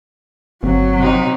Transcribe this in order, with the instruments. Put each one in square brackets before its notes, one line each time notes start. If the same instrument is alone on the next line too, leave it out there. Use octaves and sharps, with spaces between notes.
[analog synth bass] G1 [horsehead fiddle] F#3 [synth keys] A#3 C4
[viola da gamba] C3 D#4